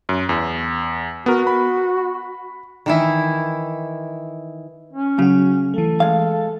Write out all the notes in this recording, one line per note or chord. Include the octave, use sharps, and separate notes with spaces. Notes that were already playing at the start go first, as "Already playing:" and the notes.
F#2
E2
B3 F#4 A#4
B5
D#3 E3 E4
C#4
C#3 F#3 F#4
E3 A3 A4
G#3 F5